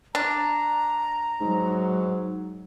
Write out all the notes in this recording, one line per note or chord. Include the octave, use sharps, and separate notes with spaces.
D4 A#5
G#2 F#3